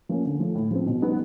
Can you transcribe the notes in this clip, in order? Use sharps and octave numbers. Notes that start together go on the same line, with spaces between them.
F3 A#3 C#4
D3
F3 A3
A2
F3 G#3 C4
B2
G3 B3 D#4